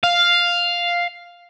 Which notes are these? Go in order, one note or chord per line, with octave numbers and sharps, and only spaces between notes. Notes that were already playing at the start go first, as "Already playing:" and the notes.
F5